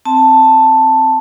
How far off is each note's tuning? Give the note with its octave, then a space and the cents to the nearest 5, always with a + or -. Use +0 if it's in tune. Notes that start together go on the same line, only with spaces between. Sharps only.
C4 +0 A5 +5